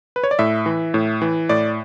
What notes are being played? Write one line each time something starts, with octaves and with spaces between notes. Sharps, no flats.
B4
C#5
D5
A2 E5
E3
A2
E3
A2 D5